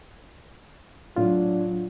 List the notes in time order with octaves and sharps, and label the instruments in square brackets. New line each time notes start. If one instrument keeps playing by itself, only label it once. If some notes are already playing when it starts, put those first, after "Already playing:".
[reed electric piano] A2 F4 [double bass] F#3 [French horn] D4